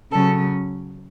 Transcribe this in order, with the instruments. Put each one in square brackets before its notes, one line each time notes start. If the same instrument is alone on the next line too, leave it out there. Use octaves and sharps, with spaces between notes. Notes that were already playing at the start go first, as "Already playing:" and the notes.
[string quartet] C#3 F#3 C#4 A4